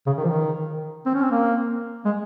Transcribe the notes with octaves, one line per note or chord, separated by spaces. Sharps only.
C#3
D#3
F3
D#3
C4
C#4
C4
A#3
G#3